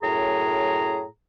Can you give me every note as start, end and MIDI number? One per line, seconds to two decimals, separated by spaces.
0.02 1.04 42
0.02 1.04 45
0.02 1.04 68
0.02 1.04 82